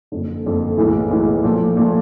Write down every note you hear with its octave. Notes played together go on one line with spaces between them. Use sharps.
F#1 F2 D3
F#1 F2 D3
B1 A2 E3 G#3
B1 A2 E3 G#3
A#2 F3 A3
A#2 F3 A3